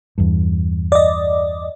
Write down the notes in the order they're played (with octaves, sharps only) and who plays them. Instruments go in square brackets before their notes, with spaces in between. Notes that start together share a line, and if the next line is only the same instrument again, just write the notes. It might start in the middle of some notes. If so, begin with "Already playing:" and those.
[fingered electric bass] E2 G2
[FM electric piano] D5 D#5